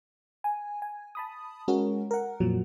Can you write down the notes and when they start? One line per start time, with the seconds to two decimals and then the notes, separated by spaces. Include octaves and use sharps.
0.44 G#5
0.82 G#5
1.15 A5 B5 D#6
1.68 G#3 C#4 F#4 A#4
2.11 A#4 F#5
2.40 F2 A#2 F3 F#3